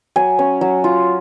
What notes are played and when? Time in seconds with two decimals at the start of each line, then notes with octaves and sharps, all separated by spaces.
0.16 F#3 G#5
0.39 C#4
0.61 F#3
0.84 F4